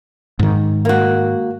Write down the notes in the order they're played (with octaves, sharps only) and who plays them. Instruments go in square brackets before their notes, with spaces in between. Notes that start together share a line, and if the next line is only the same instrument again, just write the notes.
[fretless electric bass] G#2 D#3
[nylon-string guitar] A#3 F#4